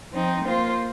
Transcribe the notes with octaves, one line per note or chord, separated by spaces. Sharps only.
F3 C4 D#4
A#3 F4 C5